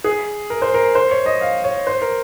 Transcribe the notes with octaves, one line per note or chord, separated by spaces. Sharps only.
G#4
A#4
C5
A#4
C5
C#5
D#5
F5
C#5
C5
A#4